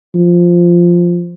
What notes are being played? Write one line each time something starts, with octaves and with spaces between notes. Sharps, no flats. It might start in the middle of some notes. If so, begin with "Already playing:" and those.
F3